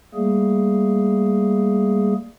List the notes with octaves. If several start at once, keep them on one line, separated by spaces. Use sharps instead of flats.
G3 A3 A#3 G#4